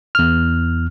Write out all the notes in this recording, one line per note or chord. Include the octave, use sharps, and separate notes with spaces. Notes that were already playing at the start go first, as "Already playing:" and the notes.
E2 F6